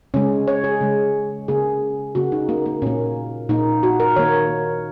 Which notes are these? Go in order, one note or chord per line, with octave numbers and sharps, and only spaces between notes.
C#3 G#3 C#4
C#5
G#4
C#3 G#3
C#3 A#3 G#4
C#3 A#3 F#4
D#4
A#3
A#3
A#2 A#3 C#4
A#2 A#3 D#4
F#4
A#4
D#3 A#3 C#5